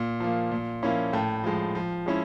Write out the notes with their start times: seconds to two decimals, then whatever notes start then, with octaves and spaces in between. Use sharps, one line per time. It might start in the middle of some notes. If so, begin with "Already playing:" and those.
Already playing: A#2
0.20 F3 A#3
0.51 A#2
0.83 F3 A#3 C#4 E4
1.13 A2 G5 A5
1.44 F3 G#3
1.75 F3
2.06 G#3 C#4 E4